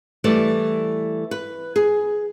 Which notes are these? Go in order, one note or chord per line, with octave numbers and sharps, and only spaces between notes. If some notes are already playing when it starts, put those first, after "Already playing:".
E3 G3 A3 D5
B4
G#4